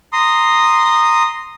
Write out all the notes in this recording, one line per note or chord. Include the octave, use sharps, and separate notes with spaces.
A#5 C6 D#6